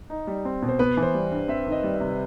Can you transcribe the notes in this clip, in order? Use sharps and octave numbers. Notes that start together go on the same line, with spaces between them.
D#4
G3
C4
B2
C5
B3 B4
E3
C5
G3
G2
C4 E5
D#3
D#5
G3
E5
C3